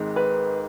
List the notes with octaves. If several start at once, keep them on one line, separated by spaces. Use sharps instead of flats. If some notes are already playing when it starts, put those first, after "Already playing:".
Already playing: G#1 G#2 D#3 G#3
B4